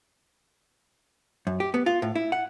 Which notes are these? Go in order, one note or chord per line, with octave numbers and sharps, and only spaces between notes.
F#2
G4
B3
F4
A2
E4
F#5